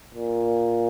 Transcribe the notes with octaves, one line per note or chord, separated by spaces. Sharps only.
A#2